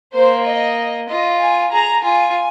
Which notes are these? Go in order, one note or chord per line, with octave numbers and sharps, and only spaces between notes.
A#3 C5
D#5
F4 D#5
G#5
G#4 A#5
F4 G#5